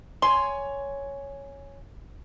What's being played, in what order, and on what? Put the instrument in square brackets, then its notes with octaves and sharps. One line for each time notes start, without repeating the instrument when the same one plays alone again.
[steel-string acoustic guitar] C#5 G#5 [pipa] C6